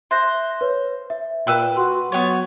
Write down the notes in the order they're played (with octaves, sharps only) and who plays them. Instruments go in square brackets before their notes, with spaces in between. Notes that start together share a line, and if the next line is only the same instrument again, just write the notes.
[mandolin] C5 [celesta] E5 F#6 A#6
[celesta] B4 C#5
E5
[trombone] A#2 [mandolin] B4 E6 F#6 [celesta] G5
[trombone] F#4 [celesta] C6
[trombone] F#3 [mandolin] B3 C#5